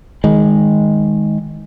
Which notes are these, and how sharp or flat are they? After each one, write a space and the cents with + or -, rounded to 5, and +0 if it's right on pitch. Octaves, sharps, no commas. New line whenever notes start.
D#3 +5 G#3 +0